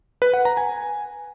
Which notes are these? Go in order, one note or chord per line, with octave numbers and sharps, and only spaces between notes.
B4
F#5
A#5
G#5